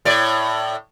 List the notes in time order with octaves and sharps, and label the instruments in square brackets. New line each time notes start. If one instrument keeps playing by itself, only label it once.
[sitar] A2 D5